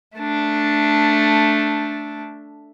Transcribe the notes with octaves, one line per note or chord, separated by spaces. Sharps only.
A3 D4